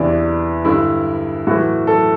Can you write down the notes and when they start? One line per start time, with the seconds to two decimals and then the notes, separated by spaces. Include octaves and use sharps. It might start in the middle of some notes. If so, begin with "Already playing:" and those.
Already playing: E2 C3 E3 D4
0.65 G2 D3 E4
1.47 A2 E3 F#4
1.87 A4